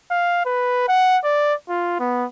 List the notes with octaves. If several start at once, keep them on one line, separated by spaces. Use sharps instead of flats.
F5
B4
F#5
D5
F4
B3